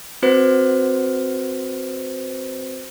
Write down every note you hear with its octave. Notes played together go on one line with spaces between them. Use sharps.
C4 F#4 B4 C5